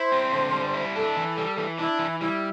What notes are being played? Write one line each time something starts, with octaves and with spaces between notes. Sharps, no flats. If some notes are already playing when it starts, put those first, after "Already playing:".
Already playing: E4 C5
C4
D3
G3
E4
D4 A4
E3
G3
E3
D4 E4
E3
G3 E4